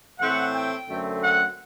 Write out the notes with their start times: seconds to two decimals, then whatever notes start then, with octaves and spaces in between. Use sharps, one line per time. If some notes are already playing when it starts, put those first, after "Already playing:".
0.18 A2 E3 A3 C4 F#5
0.53 G5
0.88 F#2 D3 A3 C4
1.21 F#5